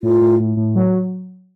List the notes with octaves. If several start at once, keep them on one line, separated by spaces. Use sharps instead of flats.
A2 F4
A2
A2
A2
F#3